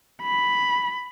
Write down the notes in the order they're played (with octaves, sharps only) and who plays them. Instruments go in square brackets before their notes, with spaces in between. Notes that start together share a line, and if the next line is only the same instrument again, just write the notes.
[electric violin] B5